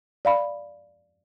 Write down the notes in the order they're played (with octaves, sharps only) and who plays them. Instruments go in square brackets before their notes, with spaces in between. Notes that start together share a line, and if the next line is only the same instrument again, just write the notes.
[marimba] D5 F5 B5